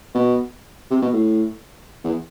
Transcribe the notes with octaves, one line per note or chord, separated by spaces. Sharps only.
B2
C3
B2
A2
E2